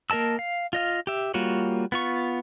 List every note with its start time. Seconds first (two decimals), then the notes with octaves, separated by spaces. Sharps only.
0.10 A#3 A#4 D#5 A5 E6
0.39 F5
0.73 F4 D#5 F5
1.07 G4 E5
1.34 G3 A#3 F4 F#4 C#5
1.92 B3 F4 C#6